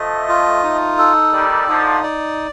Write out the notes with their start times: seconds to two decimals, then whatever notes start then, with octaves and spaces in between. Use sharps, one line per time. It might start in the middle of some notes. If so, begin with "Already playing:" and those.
Already playing: F3 A3 D#5
0.29 F4
0.64 D#4
0.98 A4
1.33 D#3 G3 D5
1.68 D3 F3 D#4
2.04 D5